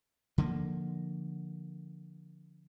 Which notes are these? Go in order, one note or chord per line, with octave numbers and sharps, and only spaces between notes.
D3 F3 G3 A#3